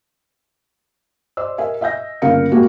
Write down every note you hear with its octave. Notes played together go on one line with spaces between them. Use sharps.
C5 D5 D#5 E6
A#4 D#5 E5 G#5
D#5 E5 G#5 G6 A#6
G1 C#3 A#3 A#4 F5 C#7
A#2 G3 G#3 A#3 F#4